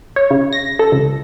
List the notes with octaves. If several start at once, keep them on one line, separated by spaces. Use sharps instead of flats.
C#5
C#3
A#6
A4
C#2